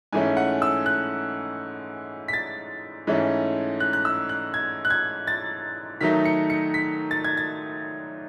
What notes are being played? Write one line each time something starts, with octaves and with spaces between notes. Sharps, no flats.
G#2 E3 A3 C#4 G#5
F#5
E6
F#6
B6
A6
G#2 E3 A3 C#4
F#6
F#6
E6
F#6
G#6
F#6
G#6
A6
D#3 F#3 A3 D#4 B6
C#7
C#7
B6
A6
G#6
A6